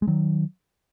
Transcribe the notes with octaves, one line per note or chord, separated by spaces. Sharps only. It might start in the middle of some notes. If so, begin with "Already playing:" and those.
G#3
D#3 F#3